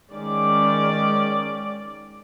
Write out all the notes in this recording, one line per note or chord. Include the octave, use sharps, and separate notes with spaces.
D#3 G#3 C#4 D5